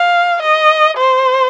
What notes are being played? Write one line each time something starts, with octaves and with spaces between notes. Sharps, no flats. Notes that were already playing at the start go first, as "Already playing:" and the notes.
Already playing: F5
D#5
C5